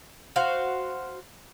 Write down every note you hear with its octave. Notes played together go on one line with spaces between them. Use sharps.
F#4 C5 F5